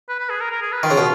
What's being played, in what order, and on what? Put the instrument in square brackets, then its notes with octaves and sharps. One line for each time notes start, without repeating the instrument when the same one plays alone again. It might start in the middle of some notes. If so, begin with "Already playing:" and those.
[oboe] B4
B4
G#4
A#4
A#4
G#4
B4
[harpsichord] D#3 [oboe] F4
[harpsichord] C#3
B2